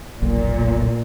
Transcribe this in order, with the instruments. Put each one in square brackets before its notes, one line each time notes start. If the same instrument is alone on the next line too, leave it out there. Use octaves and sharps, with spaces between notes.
[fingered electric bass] F1 B1 [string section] A#2